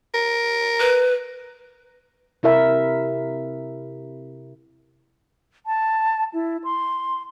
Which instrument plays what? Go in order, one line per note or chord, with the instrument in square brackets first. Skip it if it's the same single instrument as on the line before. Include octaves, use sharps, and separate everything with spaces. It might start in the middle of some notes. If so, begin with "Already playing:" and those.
[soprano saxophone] A#4
[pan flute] B4
[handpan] C3 E4 A#4 E5
[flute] A5
E4
C6